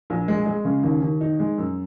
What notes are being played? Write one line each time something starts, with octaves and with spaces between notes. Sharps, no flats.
A#1
G#3
G#3
C#3
D#2
D#2
D#4
G#3
F#2